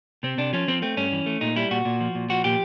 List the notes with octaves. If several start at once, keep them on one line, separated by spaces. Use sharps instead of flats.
C3 C4
C3 D4
F3 C#4
F3 C4
A3 C4
G2 C#4
E3
A3
A#2 D#4
G3 E4
A#2 F#4
A#2
F3
A#2
F3 F#4
A#2 G4